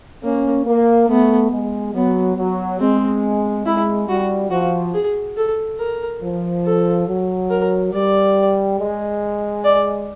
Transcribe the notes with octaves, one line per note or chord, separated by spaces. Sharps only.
A#3 C#4
A#3
A3 B3
G#3
F#3 B3
F#3
G#3 C4
G#3 E4
G3 F#4
F3 F#4
G#4
A4
A#4
F3
A4
F#3
A#4
G3 D5
G#3
D5